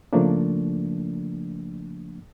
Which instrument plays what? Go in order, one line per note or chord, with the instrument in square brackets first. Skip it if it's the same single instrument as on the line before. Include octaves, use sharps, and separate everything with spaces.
[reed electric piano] C#3 F3 A3 A#3 D4